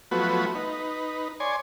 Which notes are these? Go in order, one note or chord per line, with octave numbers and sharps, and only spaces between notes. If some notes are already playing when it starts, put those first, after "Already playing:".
F3 F#3 A3 B3 F#4 B4
D#4 B4
C#5 D5 G#5 C6